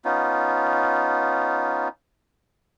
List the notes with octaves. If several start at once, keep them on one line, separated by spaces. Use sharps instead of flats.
B3 C#4 D#4 F4